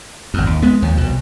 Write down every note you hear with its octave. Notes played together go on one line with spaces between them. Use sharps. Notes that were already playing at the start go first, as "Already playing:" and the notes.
G#1 F2
D#2
G#3 B3
D#2 F3
C2 B2